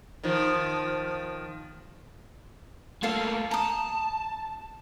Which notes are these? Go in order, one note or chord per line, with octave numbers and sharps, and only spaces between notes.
D#3 F3
A3 A#3 F4 A4 F5
A5 A#5 D#6